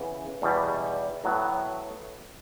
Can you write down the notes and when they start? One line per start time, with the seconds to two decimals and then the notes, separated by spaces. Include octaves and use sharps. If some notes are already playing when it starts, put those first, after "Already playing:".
Already playing: C#3 E3 B3
0.42 E2 B2 G3
1.24 A2 F#3 B3